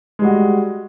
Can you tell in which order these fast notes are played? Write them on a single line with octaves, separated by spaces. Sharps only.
G#3 G3 F#4